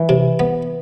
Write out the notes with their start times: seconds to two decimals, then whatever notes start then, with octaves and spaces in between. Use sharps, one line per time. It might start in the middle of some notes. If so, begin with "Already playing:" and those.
Already playing: E3
0.09 C3
0.39 B3